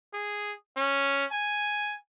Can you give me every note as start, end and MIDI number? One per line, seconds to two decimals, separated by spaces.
0.14 0.52 68
0.77 1.25 61
1.32 1.95 80